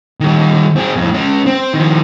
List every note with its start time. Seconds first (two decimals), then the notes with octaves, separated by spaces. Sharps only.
0.20 D#3 G3
0.76 C4 G#4
0.96 F2 A2
1.14 G#3 C#4
1.46 C4
1.73 D#3 F3